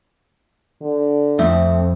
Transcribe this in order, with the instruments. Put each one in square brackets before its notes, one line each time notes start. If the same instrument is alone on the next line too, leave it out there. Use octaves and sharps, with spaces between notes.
[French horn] D3
[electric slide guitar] F2 [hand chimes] A3 E5